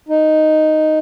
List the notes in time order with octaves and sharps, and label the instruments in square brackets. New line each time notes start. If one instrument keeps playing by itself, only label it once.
[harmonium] D#4